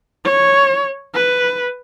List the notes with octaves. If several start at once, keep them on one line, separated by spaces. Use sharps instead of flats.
C#5
B4